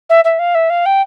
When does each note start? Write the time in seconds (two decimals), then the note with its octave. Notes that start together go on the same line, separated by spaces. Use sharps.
0.09 E5
0.24 E5
0.39 F5
0.55 E5
0.70 F5
0.86 G5